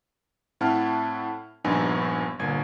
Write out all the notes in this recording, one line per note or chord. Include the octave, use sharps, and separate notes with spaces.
A2 C4 E4 F#5 A5 F6
A#1 G2 B3 D#4 B4 G#5
G1 A#2 G#6